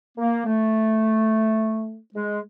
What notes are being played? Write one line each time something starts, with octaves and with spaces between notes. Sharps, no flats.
A#3
A3
G#3